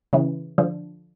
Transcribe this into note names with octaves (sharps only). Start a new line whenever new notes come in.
C#3 E3
D3 F3